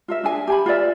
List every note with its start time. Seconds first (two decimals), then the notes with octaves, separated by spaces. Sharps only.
0.08 F4 A#4 E5
0.24 D4 G#4 G#5
0.47 G4 G#5 B5
0.66 F4 B4 D5 E5